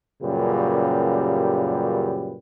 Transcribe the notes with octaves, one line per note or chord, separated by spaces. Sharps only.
F#2 A#2 C#3 G3 G4 B4